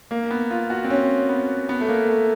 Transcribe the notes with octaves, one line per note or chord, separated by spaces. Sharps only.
A#3
B3
F4
F#4
C4
C#4
B3
B3
A3
A#3
A3